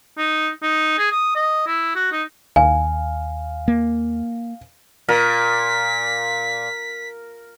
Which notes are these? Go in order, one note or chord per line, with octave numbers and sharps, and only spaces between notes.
D#4
D#4
G#4
D#6
D#5
E4
F#4
D#4
D#2 F5 G#5
A#3
A#2 A#4 B6